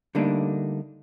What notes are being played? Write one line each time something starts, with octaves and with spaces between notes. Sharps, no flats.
D3 G3 A3 A#3 D4 D#4